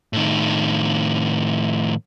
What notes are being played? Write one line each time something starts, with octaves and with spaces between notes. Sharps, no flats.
A2 D#3